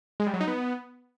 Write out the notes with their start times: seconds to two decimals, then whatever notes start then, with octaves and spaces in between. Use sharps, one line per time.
0.20 G#3
0.27 G3
0.34 F#3
0.41 D#4
0.48 B3